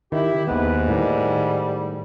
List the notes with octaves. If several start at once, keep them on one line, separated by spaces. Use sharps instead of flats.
D#3 E4 G4
D#2 G#2 B3 B4
A2 D#3 G3